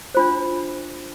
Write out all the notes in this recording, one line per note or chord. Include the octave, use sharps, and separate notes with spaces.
D4 F4 C5